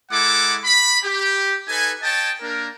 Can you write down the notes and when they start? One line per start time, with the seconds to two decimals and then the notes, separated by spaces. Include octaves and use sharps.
0.11 G#3 E4 A4 F#5 D6
0.64 B5
1.04 G4
1.68 D#4 A4 B4 G#5
2.02 C#5 D#5 G5 A5
2.41 A#3 D4 A#4